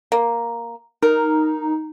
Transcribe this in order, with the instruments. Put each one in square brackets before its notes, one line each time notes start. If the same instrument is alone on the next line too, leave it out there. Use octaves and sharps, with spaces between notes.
[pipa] A#3
[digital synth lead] D#4 [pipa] A#4